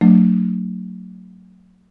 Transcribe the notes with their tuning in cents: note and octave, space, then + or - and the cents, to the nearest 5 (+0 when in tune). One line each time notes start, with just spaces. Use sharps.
F#3 -10 A3 +30 D4 +0